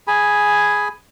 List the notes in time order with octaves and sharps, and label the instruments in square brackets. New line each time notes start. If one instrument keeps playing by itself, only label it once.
[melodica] G#4 G#5 B5